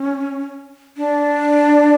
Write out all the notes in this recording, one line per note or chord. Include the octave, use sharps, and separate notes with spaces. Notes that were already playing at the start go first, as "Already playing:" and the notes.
Already playing: C#4
D4